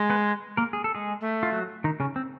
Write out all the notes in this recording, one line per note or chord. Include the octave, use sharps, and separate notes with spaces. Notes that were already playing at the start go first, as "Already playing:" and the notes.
Already playing: G#3
B3 B4
A#3 A#4
G#4
A4
G#3 G#4
A3
F4
F#3 F#4
D#3 D#4
C#3 C#4
C4